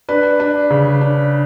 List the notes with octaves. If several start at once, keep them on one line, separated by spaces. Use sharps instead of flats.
D4 B4
D4
C#3
D4